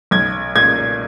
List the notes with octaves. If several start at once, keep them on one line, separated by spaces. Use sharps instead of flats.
B1 G#6
A#2 G#6